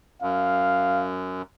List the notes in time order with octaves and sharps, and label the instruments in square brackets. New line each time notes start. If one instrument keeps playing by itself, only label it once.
[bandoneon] F#2 [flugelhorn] F5